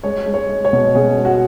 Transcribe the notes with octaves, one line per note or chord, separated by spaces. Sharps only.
G#3 C#5
G#3
C#5
G#3
C#5
B2
B2 G#4
G#3
F#4